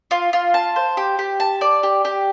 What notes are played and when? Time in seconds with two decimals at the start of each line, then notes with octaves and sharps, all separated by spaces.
0.11 F4
0.33 F4
0.54 A5
0.76 C5
0.97 G4
1.19 G4
1.40 A5
1.61 D5
1.83 G4
2.05 G4